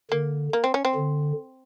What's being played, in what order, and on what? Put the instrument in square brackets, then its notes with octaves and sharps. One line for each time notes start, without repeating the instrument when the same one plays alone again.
[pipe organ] D3 [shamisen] A#3
[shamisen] A#3
C4
C#4
C4
[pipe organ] D3